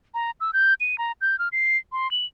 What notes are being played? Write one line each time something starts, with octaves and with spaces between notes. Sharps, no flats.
A#5
E6
G6
D#7
A#5
G6
F6
C7
C6
F#7